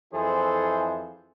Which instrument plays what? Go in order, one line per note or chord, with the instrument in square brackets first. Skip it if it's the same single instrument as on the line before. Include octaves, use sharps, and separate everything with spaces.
[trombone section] F2 E3 E4 G#4 A4 C5